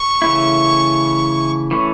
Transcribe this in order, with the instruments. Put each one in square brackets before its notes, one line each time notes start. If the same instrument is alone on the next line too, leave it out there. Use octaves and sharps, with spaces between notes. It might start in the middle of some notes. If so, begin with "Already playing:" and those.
Already playing: [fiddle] C#6
[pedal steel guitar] C#3 E3 A3 C#4 E4
E3 A3 C#4